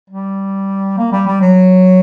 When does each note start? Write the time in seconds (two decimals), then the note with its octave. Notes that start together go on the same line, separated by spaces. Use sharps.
0.10 G3
0.98 A#3
1.12 G3
1.27 G3
1.41 F#3